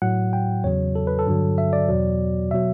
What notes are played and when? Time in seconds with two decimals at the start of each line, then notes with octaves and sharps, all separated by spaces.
0.02 A2 F#3 F#5
0.33 G5
0.64 E2 C#3 F#3 C#5
0.95 A4
1.07 B4
1.19 A4
1.27 G2 D3 F#3
1.58 E5
1.73 D5
1.88 E2 B2 F#3
2.51 B2 F#3 E5